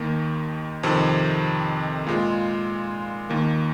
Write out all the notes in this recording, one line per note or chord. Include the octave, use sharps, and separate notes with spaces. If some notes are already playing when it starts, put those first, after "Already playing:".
Already playing: D#2 D#3 A#3
F2 C3 D#3 C4
A#2 G#3 F4
D#2 D#3 A#3